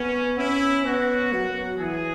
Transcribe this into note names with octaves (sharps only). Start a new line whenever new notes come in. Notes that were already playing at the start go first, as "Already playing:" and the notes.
Already playing: B3 C#4
C#4 E4
B3 F#4
F#3
E3 G#4